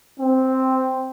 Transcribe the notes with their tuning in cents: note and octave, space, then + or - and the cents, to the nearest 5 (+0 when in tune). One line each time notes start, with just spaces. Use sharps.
C4 +0